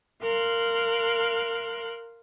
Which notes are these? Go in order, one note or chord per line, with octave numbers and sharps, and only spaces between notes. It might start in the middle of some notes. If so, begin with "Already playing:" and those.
A#4 F5 C6 F#6